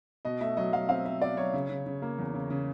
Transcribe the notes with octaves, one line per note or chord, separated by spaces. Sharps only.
B2 D#5
A3 E5
F#3 D#5
F#3 F5
C4 F5
C4 E5
B2 D5
F#3 C#5
C#3
C#3
C#3
A#3
E2
C#3
C#3